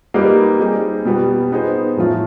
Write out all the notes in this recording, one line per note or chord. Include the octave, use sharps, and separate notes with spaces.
G3 A#3 D#4 G4 B4
G3 C4 D#4 G#4
B2 G3 B3
B3 D#4 G#4 C5
A2 F3 A3 C#4 F4